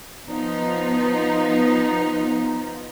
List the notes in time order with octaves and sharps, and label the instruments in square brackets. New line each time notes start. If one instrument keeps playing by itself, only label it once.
[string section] F3 B3 D#4